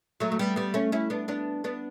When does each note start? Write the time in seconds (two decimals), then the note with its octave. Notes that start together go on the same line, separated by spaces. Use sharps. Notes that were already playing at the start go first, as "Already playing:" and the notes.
0.20 F#3 A3
0.32 A3
0.39 G3 B3
0.56 G3 B3
0.74 A3 C#4
0.92 C#4 E4
1.10 B3 D4
1.28 B3 D4
1.64 B3 D4